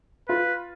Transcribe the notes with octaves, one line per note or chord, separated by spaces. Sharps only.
F4 B4